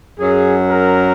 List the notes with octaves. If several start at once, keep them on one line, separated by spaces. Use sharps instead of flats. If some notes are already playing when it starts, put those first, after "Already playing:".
F#2 F#3 G#4
A#4